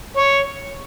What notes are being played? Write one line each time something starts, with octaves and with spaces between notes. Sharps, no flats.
C#5